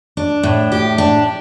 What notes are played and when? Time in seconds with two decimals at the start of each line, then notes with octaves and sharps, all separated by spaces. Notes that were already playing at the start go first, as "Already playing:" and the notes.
0.17 D4
0.43 A2
0.72 G4
0.98 D4